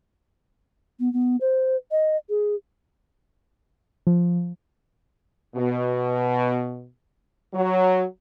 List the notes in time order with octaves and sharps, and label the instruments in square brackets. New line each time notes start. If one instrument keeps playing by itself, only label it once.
[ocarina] B3
B3
C5
D#5
G#4
[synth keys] F3
[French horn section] B2
F#3